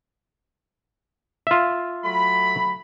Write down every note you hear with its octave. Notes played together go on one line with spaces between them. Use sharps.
F4 E5
F#3 A3 B5